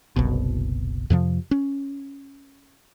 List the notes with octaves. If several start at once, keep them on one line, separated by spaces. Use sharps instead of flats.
F#1 C2 B2
F2 C3 F3
C#4